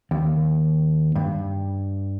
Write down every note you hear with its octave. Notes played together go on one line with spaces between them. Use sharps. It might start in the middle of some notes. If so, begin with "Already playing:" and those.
D#2
G2